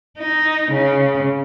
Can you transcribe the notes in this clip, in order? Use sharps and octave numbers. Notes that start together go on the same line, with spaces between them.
D#4
C#3